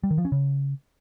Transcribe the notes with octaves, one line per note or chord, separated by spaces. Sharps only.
G3
D#3
F3
C#4
C#3